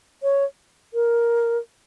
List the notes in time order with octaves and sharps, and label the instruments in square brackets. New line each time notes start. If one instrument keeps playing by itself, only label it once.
[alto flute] C#5
A#4